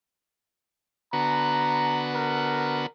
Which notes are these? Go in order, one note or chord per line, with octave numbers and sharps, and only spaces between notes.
D3 B3 F#4 A#5
A#4